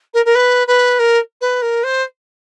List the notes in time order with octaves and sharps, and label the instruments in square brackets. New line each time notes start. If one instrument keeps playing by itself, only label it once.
[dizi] A#4
A#4
B4
B4
A#4
B4
A#4
C5